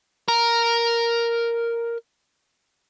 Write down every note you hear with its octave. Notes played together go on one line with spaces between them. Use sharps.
A#4 A#5